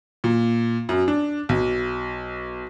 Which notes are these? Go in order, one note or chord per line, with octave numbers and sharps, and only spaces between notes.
A#2
F#2
D4
B1